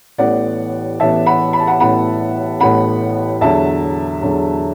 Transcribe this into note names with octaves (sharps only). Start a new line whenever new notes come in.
A1 A2 E3 B3 D5 F#5
A1 A2 E3 B3 E5 A5
F#5 B5
B5
A5
F#5 B5
A1 A2 E3 B3 F#5 B5
A1 A2 E3 B3 F#5 B5
E2 D3 F#3 E5 A5
E2 D3 F#3